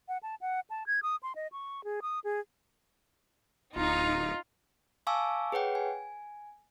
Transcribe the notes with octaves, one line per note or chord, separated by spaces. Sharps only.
F#5
A5
F#5
A5
G#6
D#6
C6
D#5
C#6
G#4
D#6
G#4
D1 D#4 F4
F5 G#5 A5 C#6 D6 E6
G#4 B4 C#5 F#5 G5
G#5